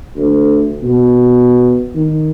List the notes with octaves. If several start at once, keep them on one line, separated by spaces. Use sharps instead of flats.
D2
B2
D#3